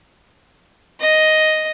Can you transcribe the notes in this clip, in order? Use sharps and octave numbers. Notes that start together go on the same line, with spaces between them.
D#5